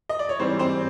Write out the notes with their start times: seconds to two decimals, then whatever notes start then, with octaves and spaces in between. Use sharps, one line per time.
0.09 D#5
0.19 D5
0.29 C#5
0.39 G#2 E3 G3 C4 C5
0.59 C4 C5